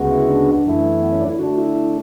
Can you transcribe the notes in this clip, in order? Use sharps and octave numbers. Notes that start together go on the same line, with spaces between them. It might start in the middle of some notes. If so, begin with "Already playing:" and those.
Already playing: D2 C#3 G#3 B3 F#4
E4
D4
F#2 E3 A3 E4
B3
C#4
D4
E4
D3 A3 D4 F#4
E4
E4